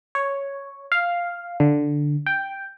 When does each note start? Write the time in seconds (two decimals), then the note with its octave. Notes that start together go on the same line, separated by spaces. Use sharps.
0.15 C#5
0.92 F5
1.60 D3
2.26 G5